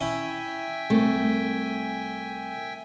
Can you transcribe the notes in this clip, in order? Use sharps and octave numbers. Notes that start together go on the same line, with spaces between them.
C#4 E4 E5 G5 G#5
C2 A3